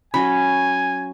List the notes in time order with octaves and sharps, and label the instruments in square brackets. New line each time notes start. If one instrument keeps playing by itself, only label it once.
[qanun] F#3 C#4 [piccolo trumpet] G#5 [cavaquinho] B5